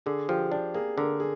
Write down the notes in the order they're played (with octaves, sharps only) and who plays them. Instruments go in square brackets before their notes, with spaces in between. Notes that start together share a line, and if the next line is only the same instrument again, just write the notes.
[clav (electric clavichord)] D3 [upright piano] G#4
[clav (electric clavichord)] F3 [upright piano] G4
[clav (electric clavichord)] D4 [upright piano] G4
[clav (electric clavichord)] A#3 [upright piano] G#4
[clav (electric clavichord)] D3 [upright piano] A#4
[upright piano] G#4